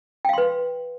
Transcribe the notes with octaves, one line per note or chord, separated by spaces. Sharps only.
B4 F5 G5 C6